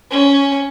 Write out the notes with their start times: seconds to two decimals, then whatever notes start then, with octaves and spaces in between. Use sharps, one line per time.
0.10 C#4